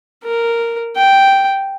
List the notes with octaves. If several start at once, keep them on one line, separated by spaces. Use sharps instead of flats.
A#4
G5